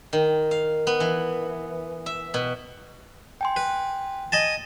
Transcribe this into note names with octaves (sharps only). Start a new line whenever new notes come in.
D#3
F5
B3
E3
E5
B2
G5 G#5 C6
B4
D#5 G#5 A5